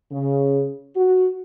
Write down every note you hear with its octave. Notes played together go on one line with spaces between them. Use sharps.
C#3
F#4